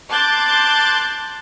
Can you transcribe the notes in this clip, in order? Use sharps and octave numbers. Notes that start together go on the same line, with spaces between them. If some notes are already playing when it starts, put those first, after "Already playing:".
A5 C6 D6 F#6 G6 A6